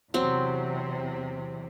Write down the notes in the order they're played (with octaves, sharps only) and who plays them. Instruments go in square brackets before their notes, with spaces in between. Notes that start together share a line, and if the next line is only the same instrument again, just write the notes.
[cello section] E2 C3 [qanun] F#3 C4